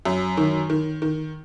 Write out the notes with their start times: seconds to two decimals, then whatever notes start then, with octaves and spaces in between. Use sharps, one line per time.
0.05 F#2
0.37 D#3
0.70 D#3
1.02 D#3